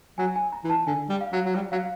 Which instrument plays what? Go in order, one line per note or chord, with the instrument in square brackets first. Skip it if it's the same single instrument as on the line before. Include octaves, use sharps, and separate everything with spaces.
[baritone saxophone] F#3 [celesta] G#5
[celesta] G#5
A#5
[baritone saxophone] E3
[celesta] A5
[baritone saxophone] D3 [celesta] G#5
[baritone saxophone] G3
[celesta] F5
[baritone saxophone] F#3
F#3
G3
[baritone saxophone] F#3 [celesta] F5